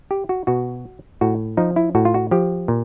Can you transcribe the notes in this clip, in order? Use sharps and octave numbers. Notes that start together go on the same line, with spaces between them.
G4
F#4
B2 F#4
A2 F#4
F3 D#4
E4
A2 F#4
F4
F#4
F3 G4
A#2